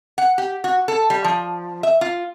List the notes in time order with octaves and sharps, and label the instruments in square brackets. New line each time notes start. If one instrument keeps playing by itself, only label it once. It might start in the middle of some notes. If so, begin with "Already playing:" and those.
[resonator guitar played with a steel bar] F#5
G4
F#4
A4
G3
F3
E5
F4